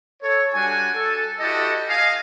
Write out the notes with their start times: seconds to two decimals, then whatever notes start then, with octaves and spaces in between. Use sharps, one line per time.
0.21 A4 C#5
0.53 G3 D4 F#4 G#5
0.95 A4
1.40 E4 F#4 G4 A4 D5 D#5
1.88 D#5 F5 G#5